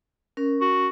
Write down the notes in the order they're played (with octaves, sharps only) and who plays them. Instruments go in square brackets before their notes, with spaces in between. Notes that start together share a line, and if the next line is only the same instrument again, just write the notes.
[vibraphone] C#4 A#4
[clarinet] F#4